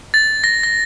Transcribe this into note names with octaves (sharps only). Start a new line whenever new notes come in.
A6
A#6
A#6